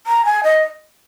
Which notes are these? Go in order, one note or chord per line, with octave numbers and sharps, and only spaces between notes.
A#5
G#5
D#5